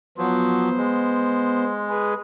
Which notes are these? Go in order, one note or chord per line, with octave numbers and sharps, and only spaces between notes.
F3 F#3 B3 C5
G#3
G#4 B4